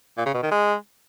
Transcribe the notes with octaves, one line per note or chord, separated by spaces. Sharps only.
A#2
C#3
B2
D#3
G#3